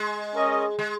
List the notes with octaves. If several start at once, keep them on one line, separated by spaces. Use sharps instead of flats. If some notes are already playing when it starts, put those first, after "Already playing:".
Already playing: G#3
C#4 A#4 D#5
G#3